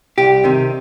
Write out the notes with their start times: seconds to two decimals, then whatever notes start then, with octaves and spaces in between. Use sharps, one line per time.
0.18 C2 G4
0.44 C3 D#3